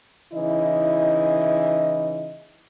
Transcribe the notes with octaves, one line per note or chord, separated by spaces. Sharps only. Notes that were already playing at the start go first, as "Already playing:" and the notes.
C#3 E3 D#4 E4 D#5